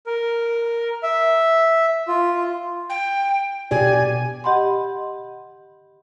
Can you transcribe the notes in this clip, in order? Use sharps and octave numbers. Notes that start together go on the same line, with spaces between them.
A#4
E5
F4
G5
B2 G4 D5 G#5
G4 D#5 F#5 B5 C6